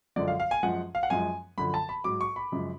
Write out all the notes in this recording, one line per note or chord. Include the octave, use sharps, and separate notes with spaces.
F#2 D3 F3 G#3 D5
F5
F5
G#5
F#2 F3 G#3 F#5
F5
F#5
F#2 F3 G#3 G#5
F#2 D3 F3 B5
A5
B5
G#2 F#3 D6
C#6
B5
F#2 C#3 F3 G#3